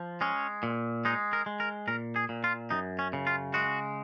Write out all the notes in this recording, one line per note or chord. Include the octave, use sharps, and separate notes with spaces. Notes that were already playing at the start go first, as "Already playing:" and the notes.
Already playing: F3
G#3 C#4
A#2
G#3 D#4
A#4
G#3
A#4
A#2 A#4
G#4
A#2
F4
F#2 D#4
C#4
C#3
F4
G#3 F#4